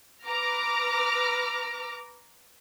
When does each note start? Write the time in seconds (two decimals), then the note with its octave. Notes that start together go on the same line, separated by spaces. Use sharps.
0.24 B4 A#5 D6 F6 A#6